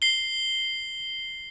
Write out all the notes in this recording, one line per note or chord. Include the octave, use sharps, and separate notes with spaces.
C7 G7